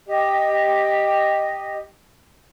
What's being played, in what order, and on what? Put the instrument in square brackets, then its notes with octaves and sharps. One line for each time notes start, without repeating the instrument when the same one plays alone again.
[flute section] G4 D#5